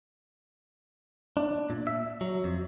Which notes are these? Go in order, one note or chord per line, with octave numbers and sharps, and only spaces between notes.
D4
A#2
E5
F#3
F2